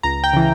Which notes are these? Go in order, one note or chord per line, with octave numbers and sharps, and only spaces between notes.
C#2 A#5
G5
C#3 E3